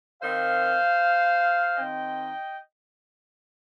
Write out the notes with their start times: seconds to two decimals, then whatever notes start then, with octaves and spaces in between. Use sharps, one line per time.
0.23 D#3 C4 C5 F5
1.77 D#3 C4 D#5 G5